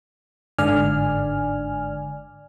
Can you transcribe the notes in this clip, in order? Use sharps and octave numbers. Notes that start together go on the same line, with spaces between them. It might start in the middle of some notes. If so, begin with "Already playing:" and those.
G1 G#2 D3 D5 G#5 F6